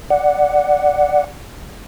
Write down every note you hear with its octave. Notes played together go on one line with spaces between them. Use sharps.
D5 F#5